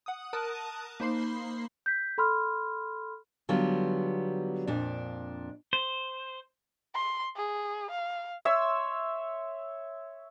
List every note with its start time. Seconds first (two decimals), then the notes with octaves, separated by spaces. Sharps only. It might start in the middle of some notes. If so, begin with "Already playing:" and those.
0.06 F#5 D#6
0.33 A#4 A5 D#6 F#6 D#7
1.00 A#3 D#4 C5 B5 C6 C7
1.86 G6 B6
2.18 A4 B5 C6 F6
3.49 D3 F#3 G3 B3 F4
4.67 F2 A#2 D4
5.73 C5
6.94 C6
7.36 G#4
7.91 F5
8.45 C#5 E5 C6 E6